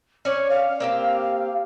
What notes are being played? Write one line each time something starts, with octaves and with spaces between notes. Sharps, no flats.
C#4 C#5 D5
F5
A#3 C4 G4